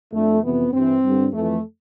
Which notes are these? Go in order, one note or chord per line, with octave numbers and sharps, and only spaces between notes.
F2 D3 A3
F2 C3 E3 B3
G2 E3 C4
G2 D3
F2 E3 A3